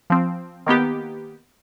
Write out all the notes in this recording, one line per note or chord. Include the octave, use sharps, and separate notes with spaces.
F3 C4
D#3 A#3 B3 G4